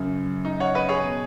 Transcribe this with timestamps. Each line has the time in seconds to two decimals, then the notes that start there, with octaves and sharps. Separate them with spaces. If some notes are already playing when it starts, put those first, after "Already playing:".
Already playing: F#2 C#3
0.45 D#4
0.60 C#5 F#5
0.75 B4 D#5
0.89 G#4 C#5
1.03 B2